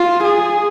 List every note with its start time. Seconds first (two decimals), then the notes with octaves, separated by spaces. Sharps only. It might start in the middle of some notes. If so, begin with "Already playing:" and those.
Already playing: F4
0.24 G#4